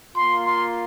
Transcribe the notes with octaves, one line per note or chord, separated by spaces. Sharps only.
A#3 F4 C6
C6